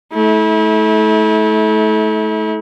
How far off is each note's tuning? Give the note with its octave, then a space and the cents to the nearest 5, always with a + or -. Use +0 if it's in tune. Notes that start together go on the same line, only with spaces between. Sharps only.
A3 -25 E4 -35